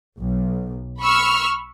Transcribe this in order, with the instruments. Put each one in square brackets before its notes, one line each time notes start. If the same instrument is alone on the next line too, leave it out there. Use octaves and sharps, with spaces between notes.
[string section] B1
B5 C#6 E6 F6